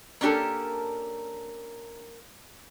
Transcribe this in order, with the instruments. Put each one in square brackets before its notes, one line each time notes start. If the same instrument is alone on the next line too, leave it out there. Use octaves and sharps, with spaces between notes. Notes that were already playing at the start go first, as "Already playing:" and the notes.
[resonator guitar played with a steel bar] A#3 C#4 D4 G4 A4 A#4